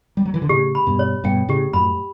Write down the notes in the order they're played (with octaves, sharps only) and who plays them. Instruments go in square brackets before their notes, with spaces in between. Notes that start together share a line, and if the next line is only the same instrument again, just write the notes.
[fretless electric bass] G3
F#3
E3
D3
[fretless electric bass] A2 C#3 [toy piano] G4
[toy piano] B5
[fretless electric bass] G2 B2
[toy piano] C#5
[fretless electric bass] G2 B2 [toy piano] G5
[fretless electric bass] A2 C#3 [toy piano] G4
[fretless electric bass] F#2 A2 [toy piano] B5